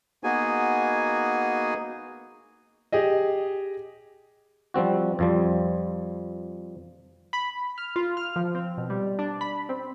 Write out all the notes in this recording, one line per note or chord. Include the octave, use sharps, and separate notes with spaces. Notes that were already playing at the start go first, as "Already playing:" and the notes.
A#3 B3 D#4 F#4 G#4 G#5
G4 G#4 D#5
F3 G3 C4 F#4
F2 F3 G3
B5
F6
F4
F6
F3
C4
B2
G3
D4
B5
C4